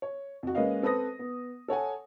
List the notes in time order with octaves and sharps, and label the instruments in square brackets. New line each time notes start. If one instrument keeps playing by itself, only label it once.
[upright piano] C#5
F2 F#4
G#3 A#3 C#4 B4 D#5 F5
C4 A4 B4 C5 D#6 A#6
B3
A4 C#5 F#5 G#5